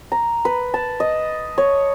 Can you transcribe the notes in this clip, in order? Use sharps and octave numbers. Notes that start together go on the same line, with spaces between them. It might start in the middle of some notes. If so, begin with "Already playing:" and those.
A#5
B4
A5
D#5
C#5